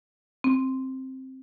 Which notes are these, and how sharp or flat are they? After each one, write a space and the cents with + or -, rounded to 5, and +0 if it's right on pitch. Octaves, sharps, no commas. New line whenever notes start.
C4 +5